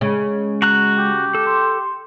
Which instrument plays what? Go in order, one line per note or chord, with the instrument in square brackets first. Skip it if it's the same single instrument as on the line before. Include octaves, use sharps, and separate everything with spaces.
[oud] C#3 [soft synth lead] G#3
[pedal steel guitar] F#4 A#5 F#6
[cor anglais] G4
[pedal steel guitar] A4 [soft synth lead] D6
[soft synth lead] C6